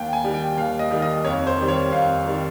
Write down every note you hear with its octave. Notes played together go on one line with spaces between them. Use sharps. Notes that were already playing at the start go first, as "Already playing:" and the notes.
Already playing: D#2 G5
G#5
D#3 G3
G5
D#2 F5
D#5
D#3 G3
D#5
F2 C#5
C5
D#3 G3
C#5
F2 F5
D#3 G3